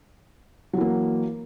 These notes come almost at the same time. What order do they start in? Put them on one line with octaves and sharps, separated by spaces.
F#3 E3 A#3